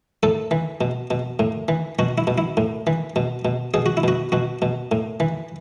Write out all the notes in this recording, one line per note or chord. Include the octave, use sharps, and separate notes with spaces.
A2 A4
E3
B2
B2
A2
E3
B2 F#4
E4
B2
E4
A2
E3
B2
B2
B2 G#4
F#4
E4
B2 F#4
B2 F#4
B2
A2
E3